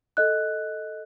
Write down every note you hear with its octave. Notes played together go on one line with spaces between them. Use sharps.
A4 D#5 F#6